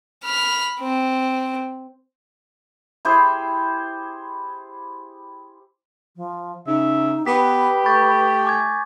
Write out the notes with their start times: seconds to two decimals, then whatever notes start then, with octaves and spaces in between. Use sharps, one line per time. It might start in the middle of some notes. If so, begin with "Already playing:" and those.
0.25 B5 F6
0.80 C4
3.05 E4 G4 G#4 C5
6.16 F3
6.67 C#3 D#4 E5
7.26 B3 G4 B4 D#6 B6
7.86 A3 C#6 G6 A6
8.45 G#5 D6 G#6